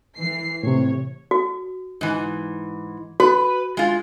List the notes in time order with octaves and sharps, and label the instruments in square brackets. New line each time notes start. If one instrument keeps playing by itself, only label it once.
[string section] E3 C7
[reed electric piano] A2 C3 [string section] C#5
[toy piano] F#4
[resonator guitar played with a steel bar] G#2 E3
[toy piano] F#4 [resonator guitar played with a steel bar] B4
[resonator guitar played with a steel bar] G#3 F4